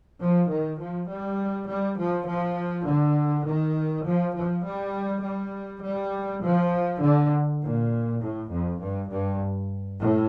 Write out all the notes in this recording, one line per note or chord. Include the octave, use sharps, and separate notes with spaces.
F3
D#3
F3
G3
G3
F3
F3
D3
D#3
F3
F3
G3
G3
G3
F3
D3
A#2
A2
F2
G2
G2
A2